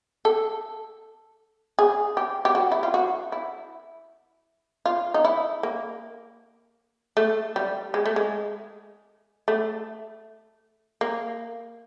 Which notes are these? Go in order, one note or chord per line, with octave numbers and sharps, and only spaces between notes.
A4
G#4
G4
G4
F#4
E4
F4
F#4
E4
F4
D#4
E4
A#3
A3
G3
G#3
A3
G#3
A3
A#3